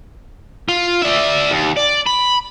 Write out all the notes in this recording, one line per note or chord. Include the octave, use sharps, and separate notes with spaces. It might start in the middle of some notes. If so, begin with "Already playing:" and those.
F4
D5 E5
D#2
D5
B5